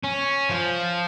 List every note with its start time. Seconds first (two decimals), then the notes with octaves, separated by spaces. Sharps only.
0.04 C#4
0.49 F3